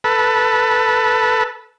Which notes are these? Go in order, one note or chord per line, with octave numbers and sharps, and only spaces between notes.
A4 B4